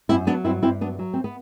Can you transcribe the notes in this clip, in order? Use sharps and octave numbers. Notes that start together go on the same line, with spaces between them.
F#2 C4 E4
F#3 B3 D4
G2 C4 E4
G2 C4 E4
F#3 B3 D4
F#3
C4
B3